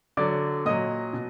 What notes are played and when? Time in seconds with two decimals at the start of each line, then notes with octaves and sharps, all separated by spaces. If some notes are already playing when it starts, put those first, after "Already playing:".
0.17 D3 F#3 D5 D6
0.66 A#2 F#3 D#5 D#6
1.13 B2